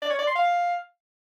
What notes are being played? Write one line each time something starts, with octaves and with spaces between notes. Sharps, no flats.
D5
C#5
D5
C6
F5